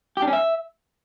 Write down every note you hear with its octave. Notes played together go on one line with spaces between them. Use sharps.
G4
D4
C#4
E5